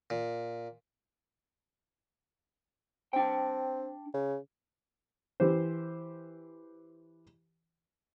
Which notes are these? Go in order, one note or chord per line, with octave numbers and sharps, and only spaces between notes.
A#2
C4 D4 G5
C#3
E3 G4 C5